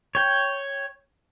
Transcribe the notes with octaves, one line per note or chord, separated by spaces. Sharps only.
C#5 G5